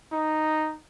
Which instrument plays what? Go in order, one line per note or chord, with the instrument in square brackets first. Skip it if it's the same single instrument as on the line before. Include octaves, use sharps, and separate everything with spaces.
[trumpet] D#4